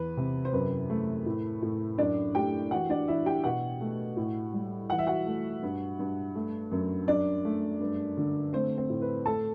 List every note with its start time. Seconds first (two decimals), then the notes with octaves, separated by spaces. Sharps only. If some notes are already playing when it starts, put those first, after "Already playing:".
Already playing: E2 B4
0.17 C3
0.45 C5
0.53 F#2 B4
0.90 A3
1.26 A2
1.62 A2
1.98 F#2 D4 D5
2.35 A3 G4 G5
2.71 E3 F#4 F#5
2.90 D4 D5
3.08 E3 E4 E5
3.26 G4 G5
3.44 B2 F#4 F#5
3.81 A3
4.17 A2
4.54 G3
4.90 E3 F#5
4.98 E5
5.07 F#4 F#5
5.26 A3
5.63 G2
5.99 G2
6.35 A3
6.72 F#2
7.08 F#2 D4 D5
7.45 A3
7.80 G2
8.17 D3
8.53 A3 C4 C5
8.77 C4 C5
8.90 A2
9.02 B4
9.26 A3 A4 A5